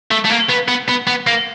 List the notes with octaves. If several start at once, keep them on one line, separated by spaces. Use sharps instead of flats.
A3
A3
A#3
B3
B3
B3
B3
A#3